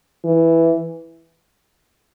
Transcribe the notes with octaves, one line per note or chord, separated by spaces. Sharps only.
E3